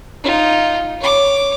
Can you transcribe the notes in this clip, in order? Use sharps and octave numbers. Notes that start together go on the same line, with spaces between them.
D#4 F4
C#5 D6